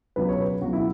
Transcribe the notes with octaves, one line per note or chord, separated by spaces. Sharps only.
C#2 B2 F#3 B4
C#5
B4
C#2 B2 F#3 F#4
E4